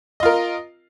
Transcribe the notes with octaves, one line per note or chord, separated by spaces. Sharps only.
F4 A#4 D#5